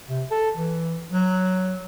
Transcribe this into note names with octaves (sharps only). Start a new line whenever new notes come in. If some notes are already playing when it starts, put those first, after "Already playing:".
C3
A4
E3
F#3